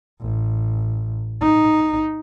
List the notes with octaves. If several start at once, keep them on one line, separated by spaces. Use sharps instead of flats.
A1
D#4